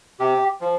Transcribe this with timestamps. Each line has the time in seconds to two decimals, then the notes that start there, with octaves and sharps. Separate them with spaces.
0.19 C3 G4
0.61 F3